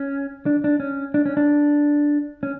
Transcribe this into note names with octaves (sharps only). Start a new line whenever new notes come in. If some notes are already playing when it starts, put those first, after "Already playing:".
Already playing: C#4
D4
D4
C#4
D4
C#4
D4
C#4